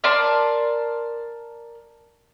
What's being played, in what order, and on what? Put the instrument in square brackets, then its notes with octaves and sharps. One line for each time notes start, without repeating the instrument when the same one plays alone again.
[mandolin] A#4 D5 A5 C6